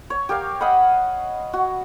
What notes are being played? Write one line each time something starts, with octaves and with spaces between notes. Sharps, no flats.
C#5
G4 A#4 F5
D#5 F5 F#5 B5
F#4